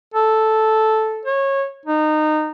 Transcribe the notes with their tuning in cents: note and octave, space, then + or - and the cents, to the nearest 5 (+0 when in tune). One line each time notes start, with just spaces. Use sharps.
A4 -5
C#5 -20
D#4 -20